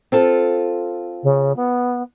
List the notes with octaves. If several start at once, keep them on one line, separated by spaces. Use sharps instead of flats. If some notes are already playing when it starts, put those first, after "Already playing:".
C4 F4 A4
C#3
B3